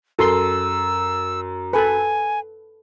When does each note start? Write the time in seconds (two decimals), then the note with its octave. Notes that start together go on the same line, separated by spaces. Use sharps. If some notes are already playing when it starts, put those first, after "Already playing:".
0.19 F#2 A4 C6 E6
1.73 A4 B4 G#5